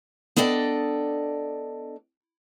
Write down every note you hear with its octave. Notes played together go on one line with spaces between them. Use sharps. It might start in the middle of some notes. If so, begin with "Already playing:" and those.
B3 D4 A4 D5 D#5 G5